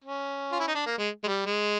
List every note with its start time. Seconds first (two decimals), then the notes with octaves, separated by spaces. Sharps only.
0.04 C#4
0.52 F4
0.60 E4
0.68 D#4
0.75 D4
0.86 A#3
0.98 G#3
1.24 G#3
1.28 G3
1.46 G#3